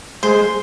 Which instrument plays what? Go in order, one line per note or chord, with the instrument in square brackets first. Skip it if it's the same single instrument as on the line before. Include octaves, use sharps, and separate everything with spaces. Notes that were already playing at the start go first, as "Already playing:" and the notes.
[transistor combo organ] G#3 [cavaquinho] C5